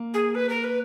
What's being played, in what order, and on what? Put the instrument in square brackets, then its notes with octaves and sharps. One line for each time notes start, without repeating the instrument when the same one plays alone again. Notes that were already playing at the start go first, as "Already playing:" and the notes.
Already playing: [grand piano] A#3
[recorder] G#4
B4
A#4
B4